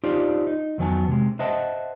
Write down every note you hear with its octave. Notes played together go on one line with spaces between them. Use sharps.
D4 D#4 F4 G4 C5 D5
D#4
F2 D#3 F#3 B3 G#5 A5
C3 G#3
B4 C5 D#5 E5 F#5 A5